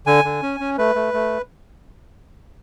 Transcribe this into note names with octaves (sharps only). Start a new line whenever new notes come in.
D3 G#5
D3
C#4
C#4
A3 B4
A3
A3